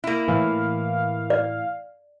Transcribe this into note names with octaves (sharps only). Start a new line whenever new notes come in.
A#3 E4
A2 E3 F5
D5